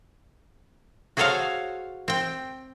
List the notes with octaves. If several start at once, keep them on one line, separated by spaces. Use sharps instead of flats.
F#4 G#4 A4 C5 C#5 F5
C4 G5